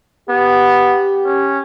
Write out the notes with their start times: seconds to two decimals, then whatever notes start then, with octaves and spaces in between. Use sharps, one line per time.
0.29 B3 G4
1.25 C#4